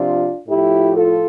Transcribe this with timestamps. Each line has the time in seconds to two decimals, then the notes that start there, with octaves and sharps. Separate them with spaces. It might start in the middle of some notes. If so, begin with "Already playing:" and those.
Already playing: C3 F3 D4 F4
0.48 A2 F3 E4 G4
0.96 F4 A4